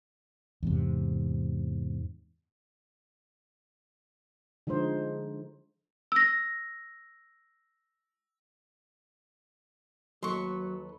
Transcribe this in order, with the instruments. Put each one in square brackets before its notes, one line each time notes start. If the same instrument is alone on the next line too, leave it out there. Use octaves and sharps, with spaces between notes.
[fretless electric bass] E2 G#2 C3
[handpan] D3 F3 G#3 D#4 C5
[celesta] E6 A#6
[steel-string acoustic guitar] D#2 A4 B4 [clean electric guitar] F#3 [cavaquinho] C6 C#6